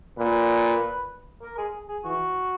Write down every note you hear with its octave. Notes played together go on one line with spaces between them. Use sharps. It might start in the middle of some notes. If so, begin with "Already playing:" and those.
A#2 B4
A#4
G#4
G#4
E3 F#4